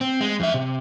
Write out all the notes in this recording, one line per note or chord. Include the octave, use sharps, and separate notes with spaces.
C4
G#3
F2 E5
C3